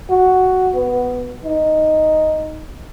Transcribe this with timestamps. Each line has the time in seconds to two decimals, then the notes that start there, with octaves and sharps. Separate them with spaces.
0.10 F#4
0.76 B3
1.46 D#4